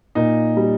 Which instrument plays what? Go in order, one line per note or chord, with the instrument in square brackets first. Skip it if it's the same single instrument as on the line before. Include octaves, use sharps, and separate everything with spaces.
[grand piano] A#2 D#4
G3